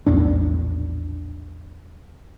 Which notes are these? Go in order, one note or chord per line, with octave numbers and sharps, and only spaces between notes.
A#1 E2 A2 D4